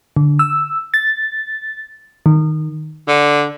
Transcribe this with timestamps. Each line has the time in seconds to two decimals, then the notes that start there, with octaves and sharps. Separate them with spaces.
0.16 D3
0.39 E6
0.94 A6
2.26 D#3
3.08 D3